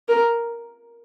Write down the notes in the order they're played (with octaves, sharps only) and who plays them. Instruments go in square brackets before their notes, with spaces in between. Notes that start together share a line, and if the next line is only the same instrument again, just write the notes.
[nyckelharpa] A#4